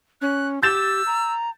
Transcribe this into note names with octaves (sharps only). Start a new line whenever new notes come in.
C#4 F#6
G4 E6 G6 A6 E7
A#5